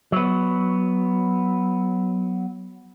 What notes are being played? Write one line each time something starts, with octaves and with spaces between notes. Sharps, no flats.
F#3 B3